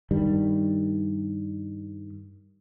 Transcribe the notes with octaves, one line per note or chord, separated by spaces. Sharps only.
G2 D#3 G3